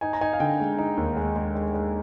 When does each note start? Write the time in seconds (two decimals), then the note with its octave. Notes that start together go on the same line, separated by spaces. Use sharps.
0.01 D#4 G#5
0.13 A#5
0.21 D#4 G#5
0.33 F5
0.40 D3 G5
0.60 G#3
0.79 D#4
0.97 D#2
1.17 G#3
1.36 G#3
1.55 G#3
1.74 G#3